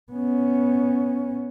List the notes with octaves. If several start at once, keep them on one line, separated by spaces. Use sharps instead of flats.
B3 C#4